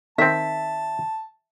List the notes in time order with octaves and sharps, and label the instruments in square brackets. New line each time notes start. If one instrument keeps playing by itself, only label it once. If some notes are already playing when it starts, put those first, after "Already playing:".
[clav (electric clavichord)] D#3 C4 [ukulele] E5 [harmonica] A5